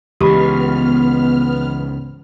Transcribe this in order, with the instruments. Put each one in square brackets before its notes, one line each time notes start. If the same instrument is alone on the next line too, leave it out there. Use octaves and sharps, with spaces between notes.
[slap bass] C#2 G#2 [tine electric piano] E3 B5 [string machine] B3 F6 [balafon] G4